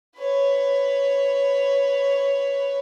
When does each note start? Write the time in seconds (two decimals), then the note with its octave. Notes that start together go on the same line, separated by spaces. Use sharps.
0.17 B4 C#5